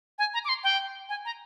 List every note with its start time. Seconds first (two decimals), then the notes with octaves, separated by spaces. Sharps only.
0.19 G#5
0.34 A#5
0.45 D6
0.49 C6
0.64 G5
1.09 G#5
1.25 A#5